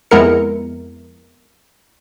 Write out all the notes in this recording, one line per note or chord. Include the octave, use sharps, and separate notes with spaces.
F2 G#3 B3 E4 A#4 C#7